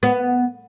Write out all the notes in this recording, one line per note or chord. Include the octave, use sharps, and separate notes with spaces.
B3